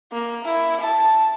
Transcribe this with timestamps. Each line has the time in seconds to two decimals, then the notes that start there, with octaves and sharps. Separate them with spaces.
0.12 A#3
0.44 E4
0.81 A5